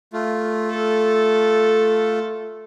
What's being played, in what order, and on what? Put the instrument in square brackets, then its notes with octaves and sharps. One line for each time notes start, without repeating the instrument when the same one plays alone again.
[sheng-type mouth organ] A3 F4
[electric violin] A4